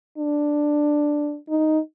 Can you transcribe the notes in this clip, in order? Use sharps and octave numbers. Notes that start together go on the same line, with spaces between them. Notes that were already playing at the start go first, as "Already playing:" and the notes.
D4
D#4